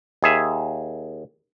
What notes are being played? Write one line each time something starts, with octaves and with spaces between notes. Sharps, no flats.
D#2 G#4 E5